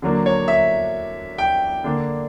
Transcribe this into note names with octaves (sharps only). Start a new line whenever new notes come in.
D3 F#3 A#3 D4
C#5
E5
G5
D3 A#3 D4